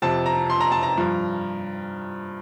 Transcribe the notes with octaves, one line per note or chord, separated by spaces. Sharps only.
F2 C3 F3 A5
A#5
C6
A#5
A5
A#5
G2 F3